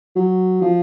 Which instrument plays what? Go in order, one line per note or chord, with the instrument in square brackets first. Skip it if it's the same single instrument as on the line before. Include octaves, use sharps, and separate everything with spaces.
[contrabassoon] F#3
F3